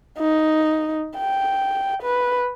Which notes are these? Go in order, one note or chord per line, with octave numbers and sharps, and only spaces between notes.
D#4
G5
B4